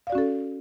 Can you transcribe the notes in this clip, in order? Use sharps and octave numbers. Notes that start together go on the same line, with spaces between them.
C#4 F#4 A4 D5 F5